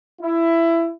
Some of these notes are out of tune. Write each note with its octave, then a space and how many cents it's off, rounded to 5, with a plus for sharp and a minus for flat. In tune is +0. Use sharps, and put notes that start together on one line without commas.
E4 +15